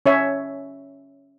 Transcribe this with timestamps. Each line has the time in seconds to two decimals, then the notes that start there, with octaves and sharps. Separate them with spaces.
0.06 C#4 C#5 E5